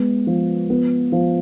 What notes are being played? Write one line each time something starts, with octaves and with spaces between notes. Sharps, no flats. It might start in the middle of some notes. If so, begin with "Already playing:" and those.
Already playing: G#3 B3
F3
B3
F3